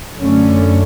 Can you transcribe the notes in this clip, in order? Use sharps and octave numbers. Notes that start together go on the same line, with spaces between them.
F#2 D3 A3 C#4